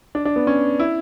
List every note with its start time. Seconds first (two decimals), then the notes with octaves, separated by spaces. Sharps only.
0.15 D4
0.25 D4
0.36 B3
0.47 C#4
0.79 E4